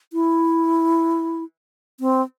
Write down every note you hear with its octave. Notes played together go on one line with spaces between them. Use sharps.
E4
C4